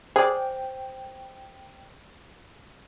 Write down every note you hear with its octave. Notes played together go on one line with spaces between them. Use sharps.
G#4 C5 D5 G5